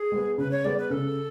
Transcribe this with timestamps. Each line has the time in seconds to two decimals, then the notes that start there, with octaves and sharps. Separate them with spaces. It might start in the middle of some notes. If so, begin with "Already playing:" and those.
Already playing: G#4
0.12 G#3 B3
0.38 C#3 B4
0.51 C#5
0.64 G#3 B3 D5
0.78 B4
0.90 C#3 A4